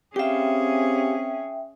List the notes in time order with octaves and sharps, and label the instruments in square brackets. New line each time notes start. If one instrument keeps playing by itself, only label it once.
[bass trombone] C4 [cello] C#4 G#4 [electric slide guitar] G4 F5 [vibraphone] E5 G5